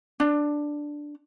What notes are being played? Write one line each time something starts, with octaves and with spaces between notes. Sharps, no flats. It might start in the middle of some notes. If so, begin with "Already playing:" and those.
D4